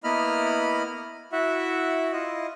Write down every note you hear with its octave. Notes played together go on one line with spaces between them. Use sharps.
A#3 B3 E4 D#5 B5 F6
E4 F#4 E5 F#5
E4 F4 D#5